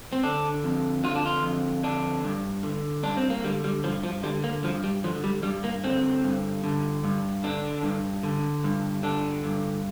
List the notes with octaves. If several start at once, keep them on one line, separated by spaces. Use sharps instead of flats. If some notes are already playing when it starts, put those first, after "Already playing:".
C4
D3 D4
F2
D3 F4
D4
F4
F2
D3 D4
G2
D3
G2 D4
C4
A#3
D3 G3
G3
G2 F3
F3
D3 G3
A#3
G2 F3
G3
D3 F3
G3
G2 G3
A#3
D3 C4
G2
D3
G2
D3 D4
G2
D3
G2
D3 D4
G2